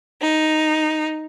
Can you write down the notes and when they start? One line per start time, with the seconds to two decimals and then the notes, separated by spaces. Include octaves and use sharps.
0.21 D#4